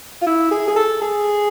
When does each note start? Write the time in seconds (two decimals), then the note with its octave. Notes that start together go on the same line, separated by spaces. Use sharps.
0.21 F4
0.26 E4
0.51 G#4
0.68 G#4
0.76 A4
1.01 G#4